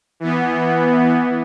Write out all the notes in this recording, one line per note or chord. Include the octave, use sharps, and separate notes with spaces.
E3 B3